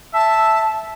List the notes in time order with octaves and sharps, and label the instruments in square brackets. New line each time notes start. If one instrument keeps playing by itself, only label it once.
[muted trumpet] E5 [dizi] A5